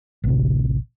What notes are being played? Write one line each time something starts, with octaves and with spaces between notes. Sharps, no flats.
A1 D2 C3